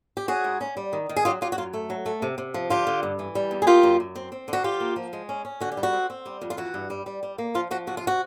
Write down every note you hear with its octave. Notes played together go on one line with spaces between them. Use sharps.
G4
C#4 F#4 G#4
G#2
C#4
G3
D#3
D#3
G#4
F#3 F4 G4
F#3 F4 G4
F#4
F#2 F4
A3
F#3
A3
C3
C3
F3
D3 F4 G4
D3
G2
E3
G3
E2
G#4
A#3 F4 G4
F#2
F#2
C4
C4
D3
F#4
F3 F4 G4
A#3
F3
G#3
C#4
C#4
D3 F#4
G4
G3
F#4
C4
C4
G3
F2
F4
E3 F#4
G2
G3
G3
G3
A#3
F3 F4
F3 F#4
C3 F#4
F4
F#4